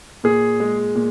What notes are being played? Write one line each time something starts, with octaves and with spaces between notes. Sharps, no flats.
A#2 G#4
G#3
A#2